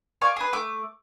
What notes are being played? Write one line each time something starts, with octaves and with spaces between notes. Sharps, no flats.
D5 F5 G#5 C#6
G#4 B4
A3 D6